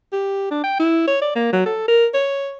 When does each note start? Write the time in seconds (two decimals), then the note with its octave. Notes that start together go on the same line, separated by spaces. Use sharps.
0.13 G4
0.51 D4
0.64 G5
0.80 E4
1.08 C#5
1.21 D5
1.35 A#3
1.53 F#3
1.66 A4
1.88 A#4
2.14 C#5